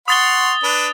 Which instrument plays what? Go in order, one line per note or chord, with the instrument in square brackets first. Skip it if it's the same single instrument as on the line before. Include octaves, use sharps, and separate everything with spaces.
[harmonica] F#5 C6 C#6 [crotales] D#6 A6 G7
[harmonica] D4 B4